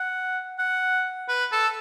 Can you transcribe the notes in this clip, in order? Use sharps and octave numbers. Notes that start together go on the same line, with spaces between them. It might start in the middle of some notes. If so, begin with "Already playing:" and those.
Already playing: F#5
F#5
B4
A4